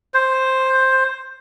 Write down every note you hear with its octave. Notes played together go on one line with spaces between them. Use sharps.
C5